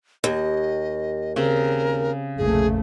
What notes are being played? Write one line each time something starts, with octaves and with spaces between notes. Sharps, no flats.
D#2 D#5
C#3 C4 A#4
F1 A#1 A3 G#4